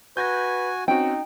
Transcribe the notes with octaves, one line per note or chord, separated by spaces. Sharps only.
F#4 B4 G#5 G6 G#6 A#6
C4 C#4 D#4 F#4 G5